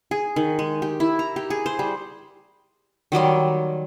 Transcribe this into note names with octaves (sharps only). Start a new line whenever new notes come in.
G#4
D#3
G#3
G4
E4
A#5
G4
G#4
C5
G3
D#3 F#3 G3 C6